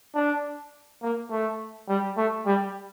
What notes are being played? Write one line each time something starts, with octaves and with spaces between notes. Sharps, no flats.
D4
A#3
A3
G3
A3
G3